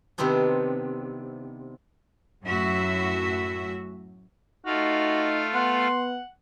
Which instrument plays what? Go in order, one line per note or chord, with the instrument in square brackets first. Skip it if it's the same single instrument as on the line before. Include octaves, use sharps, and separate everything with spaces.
[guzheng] C3 D#3 B3 C4 D4
[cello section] F#2 A2 F#3 F#4 E5
[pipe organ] A3 F4 F5 [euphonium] D#4 [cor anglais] F#4
[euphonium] B3 [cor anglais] F#5 [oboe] C6